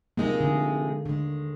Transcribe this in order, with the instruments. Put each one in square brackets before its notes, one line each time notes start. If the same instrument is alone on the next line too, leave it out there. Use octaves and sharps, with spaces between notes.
[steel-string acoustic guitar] C3 F3 G#3 D#4 G#4 [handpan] A#3
[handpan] D3
[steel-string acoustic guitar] D#2 D#3 G#3 [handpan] D3